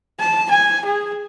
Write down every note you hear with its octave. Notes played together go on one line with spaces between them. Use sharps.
A5
G#5
G#4